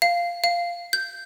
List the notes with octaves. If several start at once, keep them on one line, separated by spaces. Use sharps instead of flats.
F5
F5
G6